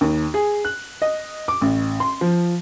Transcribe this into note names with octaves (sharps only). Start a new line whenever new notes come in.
D#2
G#4
F#6
D#5
D6
A1
C6
F3